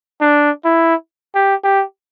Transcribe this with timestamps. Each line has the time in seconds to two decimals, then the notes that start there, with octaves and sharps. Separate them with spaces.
0.21 D4
0.65 E4
1.35 G4
1.64 G4